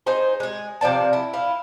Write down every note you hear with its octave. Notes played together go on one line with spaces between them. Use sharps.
D#4 G#4 C5
G#3 G#4
C3 F3 D5 A5
E4
E4 F4